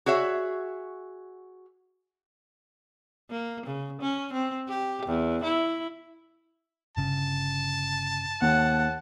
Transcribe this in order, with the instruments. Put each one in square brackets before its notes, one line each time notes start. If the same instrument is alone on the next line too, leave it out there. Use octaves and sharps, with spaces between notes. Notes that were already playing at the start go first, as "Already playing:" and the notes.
[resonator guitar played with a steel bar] F#4 G#4 C#5 E5
[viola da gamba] A#3
C#3
C#4
C4
G4
E2
E4
[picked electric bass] G1 C#3 [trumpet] A5
[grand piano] D#2 [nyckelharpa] F#5